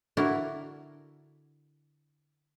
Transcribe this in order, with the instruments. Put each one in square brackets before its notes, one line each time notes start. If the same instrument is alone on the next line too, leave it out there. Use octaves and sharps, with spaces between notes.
[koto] D3 D4 E4 F#4 A#4